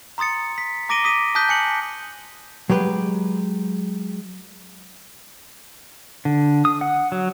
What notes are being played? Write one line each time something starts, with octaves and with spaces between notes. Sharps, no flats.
A#5 C6 D#6 A6 C#7
B6
A#5 D6 A#6 D7 D#7 G7
D#6 B6 D#7
A5 D#6 F#6 G6 B6 G7
G#5 C#7 F#7
F#3 G#3 G4 B4
D3
D#6
F#5
F#3